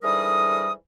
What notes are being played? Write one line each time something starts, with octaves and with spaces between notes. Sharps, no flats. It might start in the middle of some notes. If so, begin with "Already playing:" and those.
G#2 D3 E3 G3 A#4 D#6